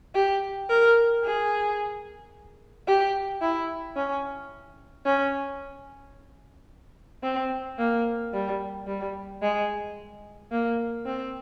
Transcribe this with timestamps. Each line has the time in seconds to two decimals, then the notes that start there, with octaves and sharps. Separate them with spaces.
0.15 G4
0.70 A#4
1.24 G#4
2.87 G4
3.42 E4
3.96 C#4
5.05 C#4
7.23 C4
7.78 A#3
8.34 G3
8.87 G3
9.42 G#3
10.52 A#3
11.06 C4